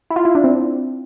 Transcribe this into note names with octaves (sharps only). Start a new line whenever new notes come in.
E4
F4
E4
D4
C4